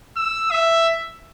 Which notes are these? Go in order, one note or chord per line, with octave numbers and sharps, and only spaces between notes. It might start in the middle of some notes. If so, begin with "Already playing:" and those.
E6
E5